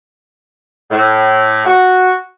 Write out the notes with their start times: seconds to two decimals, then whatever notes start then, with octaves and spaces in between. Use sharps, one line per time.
0.90 A2
1.66 F#4